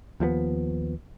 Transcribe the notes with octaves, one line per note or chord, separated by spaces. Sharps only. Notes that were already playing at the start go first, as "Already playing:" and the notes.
D#2 F3 G3 B3